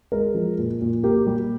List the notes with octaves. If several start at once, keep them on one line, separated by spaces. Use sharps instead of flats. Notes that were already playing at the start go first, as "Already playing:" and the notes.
G#3 A#4
F3
A#2
A#2
A#3 G4
G3